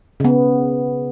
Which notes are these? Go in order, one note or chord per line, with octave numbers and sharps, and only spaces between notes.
C#3 B3